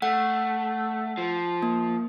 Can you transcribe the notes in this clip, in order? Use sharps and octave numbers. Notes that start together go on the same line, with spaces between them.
A3 F#5
F3
A#3